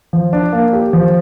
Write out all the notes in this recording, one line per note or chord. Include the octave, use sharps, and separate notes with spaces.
F3
D4
A#3
G4
F3